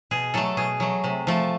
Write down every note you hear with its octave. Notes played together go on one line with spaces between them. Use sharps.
B2 G#4
F#3 A3 A4
B2 G#4
F#3 A3
C3
F3 A3